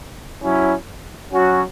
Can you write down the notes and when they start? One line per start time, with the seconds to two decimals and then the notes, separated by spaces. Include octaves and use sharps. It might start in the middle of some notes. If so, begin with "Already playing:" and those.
0.42 F#3 C#4 E4
1.32 F#3 C#4 F#4